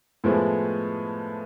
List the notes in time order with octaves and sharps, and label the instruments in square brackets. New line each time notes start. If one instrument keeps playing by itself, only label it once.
[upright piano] A2 F3 G#3 B3 E4